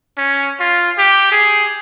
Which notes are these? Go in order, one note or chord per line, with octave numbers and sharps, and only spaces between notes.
C#4
F4
G4
G#4